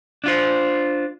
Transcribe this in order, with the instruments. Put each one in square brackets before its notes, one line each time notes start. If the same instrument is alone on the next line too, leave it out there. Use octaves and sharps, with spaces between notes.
[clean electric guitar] D4 F4 C5